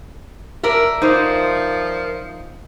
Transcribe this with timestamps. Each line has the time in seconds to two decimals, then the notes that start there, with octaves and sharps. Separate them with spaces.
0.63 A#4 D5 E5
1.02 F3 D#4 C5